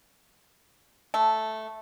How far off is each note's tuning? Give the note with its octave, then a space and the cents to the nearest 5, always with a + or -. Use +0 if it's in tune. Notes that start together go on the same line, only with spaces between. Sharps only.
A3 -5